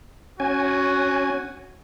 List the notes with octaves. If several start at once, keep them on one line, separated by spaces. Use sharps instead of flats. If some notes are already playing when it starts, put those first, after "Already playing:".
C#4 F#4 G#5